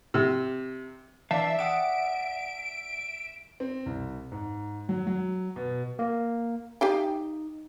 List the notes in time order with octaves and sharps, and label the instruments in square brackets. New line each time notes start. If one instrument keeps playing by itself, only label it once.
[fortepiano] C3
[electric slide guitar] E3 F5 [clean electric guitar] D5 A5 [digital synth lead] E5
[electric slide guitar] E5 [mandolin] F#5 D6 D#6 [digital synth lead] D7
[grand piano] C4
C2
G#2
F#3
F#3
B2
[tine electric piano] A#3
[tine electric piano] D#4 [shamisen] G4 F5 G5